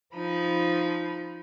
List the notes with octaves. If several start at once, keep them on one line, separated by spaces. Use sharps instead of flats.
F3 D#4 B5